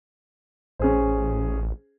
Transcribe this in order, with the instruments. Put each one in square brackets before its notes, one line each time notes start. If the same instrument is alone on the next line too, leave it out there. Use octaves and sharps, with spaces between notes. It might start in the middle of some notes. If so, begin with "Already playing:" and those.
[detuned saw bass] A1 [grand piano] C#4 G#4 C5